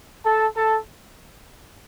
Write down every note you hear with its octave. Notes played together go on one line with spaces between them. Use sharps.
A4 A5
A4 A5